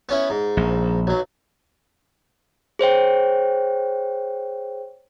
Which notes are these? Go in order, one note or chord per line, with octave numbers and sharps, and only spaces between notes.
B3 C#4 E4
G#2
A#1
B1 F#3
G#4 C5 C#5 G5